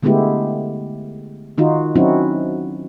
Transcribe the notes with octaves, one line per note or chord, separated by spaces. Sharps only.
D3 G#3 A3 B3 E4 G4
D#3 D#4 F4 F#4
F#3 C4 C#4 D#4 E4 F#4